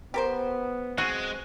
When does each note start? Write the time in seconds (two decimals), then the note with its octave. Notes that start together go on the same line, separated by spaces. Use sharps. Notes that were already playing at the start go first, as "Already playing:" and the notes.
0.14 B3 G4 A#4 C5
0.98 G#3 C4 F#4